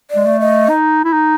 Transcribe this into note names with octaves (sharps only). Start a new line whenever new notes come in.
D5
G#3
A3
D#5
D#4
E4
D#4